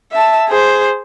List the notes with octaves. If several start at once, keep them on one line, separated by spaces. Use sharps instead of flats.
E5 A5
G#4 C5